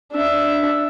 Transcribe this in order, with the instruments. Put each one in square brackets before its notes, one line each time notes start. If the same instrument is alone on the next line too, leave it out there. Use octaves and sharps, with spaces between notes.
[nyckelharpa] D4 E5